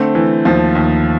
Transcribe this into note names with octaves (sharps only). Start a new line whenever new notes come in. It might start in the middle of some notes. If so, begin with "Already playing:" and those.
Already playing: D3 A3 C4
E3
D#2 F3
D#2